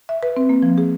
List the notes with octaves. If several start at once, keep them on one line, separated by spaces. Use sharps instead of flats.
E5
B4
C4
A#3
F3
G#4